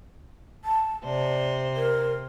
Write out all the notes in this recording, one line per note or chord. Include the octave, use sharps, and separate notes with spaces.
A5
C3 C5 D5
A#4